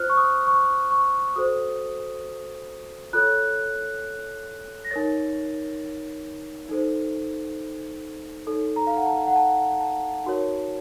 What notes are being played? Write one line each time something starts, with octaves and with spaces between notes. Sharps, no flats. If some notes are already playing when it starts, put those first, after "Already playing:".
Already playing: F4 C5 F6 F#6
C#6
D#6
C#6
C#6
F#4 A4 C5 D#6
F4 A4 C#5 F#6
A#6
D#4 A#4 C#5 A6
D#4 A4 C5
D#4 A4 C#5
A#5
F5
F#5
A5
F#5
A5
A5
D#4 F#4 A#4 C#5